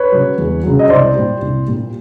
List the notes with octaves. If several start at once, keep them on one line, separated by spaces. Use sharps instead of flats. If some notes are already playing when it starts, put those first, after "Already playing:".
Already playing: B4 C#5
C#3 F#3
E2
C#3 F#3
D#5
C2 C5 D5
A#2 G3
C2
A#2 G3